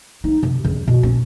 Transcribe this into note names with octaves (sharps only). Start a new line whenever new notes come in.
D#4
C3
C#3
B2
C#4